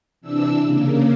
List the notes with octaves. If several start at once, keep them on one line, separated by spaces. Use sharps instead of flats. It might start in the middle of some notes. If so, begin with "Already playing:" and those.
C3 E3 D4 E6
C#3 A#3